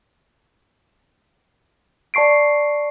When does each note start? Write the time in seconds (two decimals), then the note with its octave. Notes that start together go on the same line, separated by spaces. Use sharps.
2.14 D5 A5 C#6 C7 D7